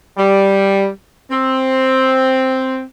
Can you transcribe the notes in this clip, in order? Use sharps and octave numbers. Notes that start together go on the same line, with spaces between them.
G3
C4